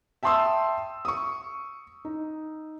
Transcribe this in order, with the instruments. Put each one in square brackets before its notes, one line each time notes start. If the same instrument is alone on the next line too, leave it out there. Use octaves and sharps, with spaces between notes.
[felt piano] E5 G5 A5 C6 D#6 E6
C#6 D#6
D#4